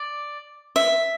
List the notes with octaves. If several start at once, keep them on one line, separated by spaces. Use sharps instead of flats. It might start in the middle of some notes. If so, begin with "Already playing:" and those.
Already playing: D5
E5